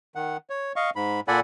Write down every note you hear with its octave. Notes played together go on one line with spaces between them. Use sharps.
D#3 F#5
C#5
D#5 F5 C#6
G#2 B5
A#2 A4 D5 F#5 G#5 B5